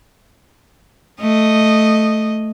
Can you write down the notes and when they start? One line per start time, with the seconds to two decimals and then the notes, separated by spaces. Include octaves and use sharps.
1.20 A3 D#5